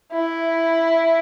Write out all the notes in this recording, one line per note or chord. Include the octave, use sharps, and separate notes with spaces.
E4